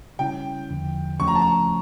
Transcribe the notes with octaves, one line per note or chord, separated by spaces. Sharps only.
C#3 G3 C#4 E4 G5
E2 D3 F3
D2 C#3 F3 A3 C#4 C#6
A#5
A5
A#5